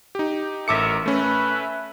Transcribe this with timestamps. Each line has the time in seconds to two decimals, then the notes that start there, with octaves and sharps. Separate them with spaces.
0.15 D#4 G4
0.68 A1 A4 A#4 E5 D6 C#7
1.06 A3 C#4 B4 E5